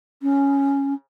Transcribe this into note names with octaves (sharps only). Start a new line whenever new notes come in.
C#4